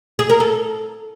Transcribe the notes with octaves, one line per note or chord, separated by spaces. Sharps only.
G#4
A#4
A4